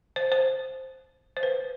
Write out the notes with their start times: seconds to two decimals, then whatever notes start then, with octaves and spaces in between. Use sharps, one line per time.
0.16 C5
0.32 C5
1.37 C5
1.43 B4